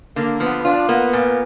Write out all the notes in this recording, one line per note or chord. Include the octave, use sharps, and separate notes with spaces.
D3 A#3
F3 B3
D4 F4
A#3 B3
A#2